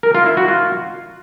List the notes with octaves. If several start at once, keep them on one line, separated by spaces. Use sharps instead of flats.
A#4
F4
E4
F#4
F4